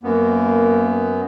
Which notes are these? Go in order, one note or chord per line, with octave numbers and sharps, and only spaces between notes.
F#2 A#3 B3